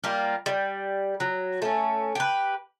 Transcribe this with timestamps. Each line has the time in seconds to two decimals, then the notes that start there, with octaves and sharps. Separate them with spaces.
0.04 G3 A#3 F4
0.46 G3
1.20 F#3
1.62 A3 C#4
2.15 G4 B4